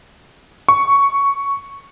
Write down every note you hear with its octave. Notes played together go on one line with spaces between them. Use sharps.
C#6